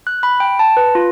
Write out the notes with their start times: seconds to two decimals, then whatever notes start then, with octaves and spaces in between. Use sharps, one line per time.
0.07 F#6
0.23 B5
0.40 G5
0.59 A5
0.77 B4
0.95 F4